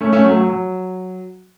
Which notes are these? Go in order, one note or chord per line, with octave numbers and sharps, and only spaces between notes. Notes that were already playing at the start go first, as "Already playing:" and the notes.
A3 C#4
A3 C#4
F#3 A3
F#3
F#3